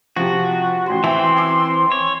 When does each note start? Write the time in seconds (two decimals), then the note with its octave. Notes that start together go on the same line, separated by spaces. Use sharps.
0.16 C3 F3 F#4
0.86 A1 F#4 C6
1.04 E3 C4 E5 G5 G#5
1.36 G#5 D6 E6
1.92 C#5